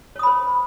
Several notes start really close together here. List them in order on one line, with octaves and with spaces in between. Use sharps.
C#5 D#6 B5 C5